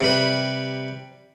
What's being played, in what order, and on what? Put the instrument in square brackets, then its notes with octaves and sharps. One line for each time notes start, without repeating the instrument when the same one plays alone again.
[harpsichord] C3 G3 B4